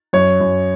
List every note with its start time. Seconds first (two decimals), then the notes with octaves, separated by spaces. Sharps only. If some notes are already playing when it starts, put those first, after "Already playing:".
0.13 F#2 C#5
0.40 F#2